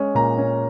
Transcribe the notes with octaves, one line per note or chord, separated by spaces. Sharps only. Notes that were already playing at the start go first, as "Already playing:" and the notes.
Already playing: G#3 C#4
A#2 A#5
C#4